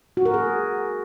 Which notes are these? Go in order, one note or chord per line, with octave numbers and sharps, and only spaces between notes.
F#4
A#4
G#4